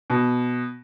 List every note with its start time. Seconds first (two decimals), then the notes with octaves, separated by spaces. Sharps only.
0.10 B2